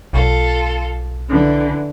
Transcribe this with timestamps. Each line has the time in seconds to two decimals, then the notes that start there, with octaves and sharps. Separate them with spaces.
0.13 B1 F4 A4
1.27 D3 E3